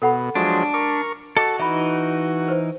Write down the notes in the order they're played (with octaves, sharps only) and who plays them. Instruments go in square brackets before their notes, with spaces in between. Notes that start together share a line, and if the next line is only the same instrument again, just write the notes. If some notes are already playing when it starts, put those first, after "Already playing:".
[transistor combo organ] B2 [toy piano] A4 F#5 B5
[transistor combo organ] F3 F#3 G#3 [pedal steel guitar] D4
[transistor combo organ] A#4 C#6 [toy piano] D6
[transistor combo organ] F#4 [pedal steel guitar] A4 [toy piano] D#5 D6
[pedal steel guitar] E3 D#4 [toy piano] E5 B5
[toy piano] B4 C5